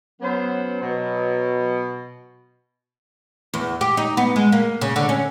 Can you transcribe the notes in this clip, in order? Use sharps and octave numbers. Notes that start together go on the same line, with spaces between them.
F#3 B3 C#4 C5
B2
E2
G4
D#4
B3
G#3
A#3
C#3
D3
C#4